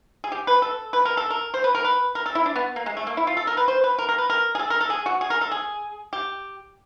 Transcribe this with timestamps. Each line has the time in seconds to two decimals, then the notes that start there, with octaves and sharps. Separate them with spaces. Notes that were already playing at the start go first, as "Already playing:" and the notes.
0.24 G#4
0.32 G4
0.47 B4
0.62 A4
0.93 B4
1.05 A#4
1.17 A4
1.30 A#4
1.54 C5
1.64 B4
1.75 A#4
1.85 B4
2.15 A#4
2.26 A4
2.35 E4
2.46 D4
2.56 B3
2.76 A#3
2.86 G#3
2.97 A3
3.07 A#3
3.17 E4
3.27 F4
3.37 A4
3.47 A#4
3.57 B4
3.68 C5
3.84 B4
3.99 A#4
4.09 A#4
4.18 B4
4.30 A#4
4.55 G#4
4.59 A4
4.70 A#4
4.81 A4
4.90 G#4
5.06 F#4
5.21 G#4
5.30 A#4
5.41 A4
5.51 G#4
6.13 G4